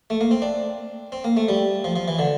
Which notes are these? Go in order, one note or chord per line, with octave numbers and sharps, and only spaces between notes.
A3
A#3
C4
D4
C4
A#3
A3
G3
F3
F3
E3
D3